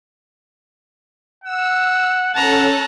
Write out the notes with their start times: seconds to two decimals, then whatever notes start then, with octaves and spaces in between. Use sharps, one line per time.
1.44 F#5 E6
2.34 C#4 A4 F#5 A5 A#5 F#6